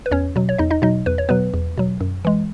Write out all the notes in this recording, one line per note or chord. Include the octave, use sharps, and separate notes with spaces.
B4
E2 C#4 C#5
B2 F#3
C#5
E2 D#4 D#5
D#4 D#5
B2 F#3 D#4 D#5
E2 B4
C#5
B2 F#3 B3 B4
E2
B2 F#3
F#2
E3 G#3